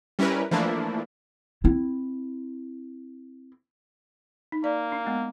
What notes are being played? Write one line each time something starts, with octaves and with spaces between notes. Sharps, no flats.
G3 C#4 E4 A#4 B4
E3 F3 A3 A#3 D4 E4
C4 E4
D#4
A#3 D5
D4
G#3 B3 D#5